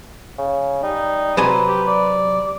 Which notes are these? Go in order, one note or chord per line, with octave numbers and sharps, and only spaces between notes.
C#3
G3 D#4
C3 F#3 B4 G#5
G4
D5